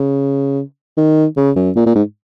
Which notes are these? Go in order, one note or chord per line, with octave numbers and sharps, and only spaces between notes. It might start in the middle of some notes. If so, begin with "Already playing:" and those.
Already playing: C#3
D#3
C#3
F#2
A#2
A#2
G#2